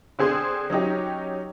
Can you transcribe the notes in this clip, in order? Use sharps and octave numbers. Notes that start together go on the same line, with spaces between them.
D3 C4 G#4 C6 D#6
F#3 C#4 D#4 G4